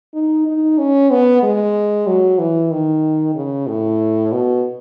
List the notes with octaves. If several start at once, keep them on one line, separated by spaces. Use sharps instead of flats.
D#4
D#4
C#4
B3
G#3
F#3
E3
D#3
C#3
A2
B2